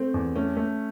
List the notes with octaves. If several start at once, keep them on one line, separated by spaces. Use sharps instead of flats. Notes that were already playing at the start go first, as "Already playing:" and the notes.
Already playing: A3 C4
E2
A3 C#4
A3